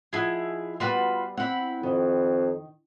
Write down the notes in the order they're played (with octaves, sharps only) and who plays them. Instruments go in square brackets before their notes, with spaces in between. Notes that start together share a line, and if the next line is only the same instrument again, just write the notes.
[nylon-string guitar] F3 D#5 F#5 [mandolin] E4 G#4
[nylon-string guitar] G3 B3 G5 [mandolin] F4 F#4 B4
[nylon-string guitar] C4 E4 [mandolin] F#5 B5
[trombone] F2 [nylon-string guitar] D#3